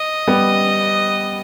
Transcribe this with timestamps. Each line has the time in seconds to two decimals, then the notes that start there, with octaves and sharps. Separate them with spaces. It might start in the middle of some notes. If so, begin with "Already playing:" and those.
Already playing: D#5
0.27 G3 B3